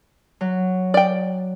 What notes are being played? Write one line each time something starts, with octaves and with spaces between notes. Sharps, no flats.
F#3
D5 G5